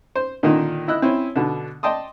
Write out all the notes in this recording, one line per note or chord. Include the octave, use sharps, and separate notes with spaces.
C5
A#2 D3 D#3 D4 D#4
E4 D#5 E6 F#6
C4 C#4 E4
B2 D3 D4
D5 D#5 G5 A5 C6 D#6